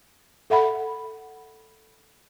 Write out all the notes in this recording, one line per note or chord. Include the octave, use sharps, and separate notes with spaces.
A4 E5 F#5 B5